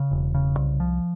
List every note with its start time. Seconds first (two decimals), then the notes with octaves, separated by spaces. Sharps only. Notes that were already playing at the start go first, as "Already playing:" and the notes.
Already playing: C#3
0.11 E1
0.34 C#3
0.57 C2
0.80 F3